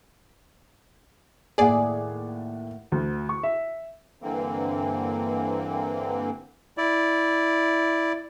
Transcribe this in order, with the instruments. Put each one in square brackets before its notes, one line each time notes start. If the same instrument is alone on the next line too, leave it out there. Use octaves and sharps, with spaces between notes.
[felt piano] D#2 A2 F#5 [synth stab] G#4 D5
[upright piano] D2
C#6
E5
[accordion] G2 D3 E3 A#3 C4
[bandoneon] E4 D5